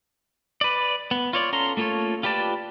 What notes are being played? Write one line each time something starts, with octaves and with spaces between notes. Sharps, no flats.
B4 D5
B3
F4 C#5 D5
C#4 A4 F5 A#5 C6
A3 A#3 F4 A4 C#5
F4 G4 B4 D5 A5